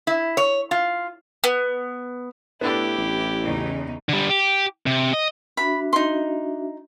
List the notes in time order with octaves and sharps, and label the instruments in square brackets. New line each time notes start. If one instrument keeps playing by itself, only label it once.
[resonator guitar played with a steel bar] E4
C#5
F4
[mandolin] B3
[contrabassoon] A2 [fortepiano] B3 D4 A4 [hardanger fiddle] E4 G4
[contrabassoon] A1
[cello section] E2 C#3 D#4
[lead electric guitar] D3 G3
G4
C3
D#5
[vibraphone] D4 F#4 E5 [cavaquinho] B5
[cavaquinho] D#4 C6